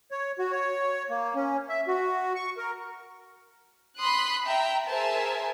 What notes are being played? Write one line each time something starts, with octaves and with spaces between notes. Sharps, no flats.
C#5
F#4
C#5
A#3
C#4
E5
F#4
C#6
A#4
B5 C6 D#6 F#6
E5 G5 A#5
G#4 A#4 C5 E5 G#5 A5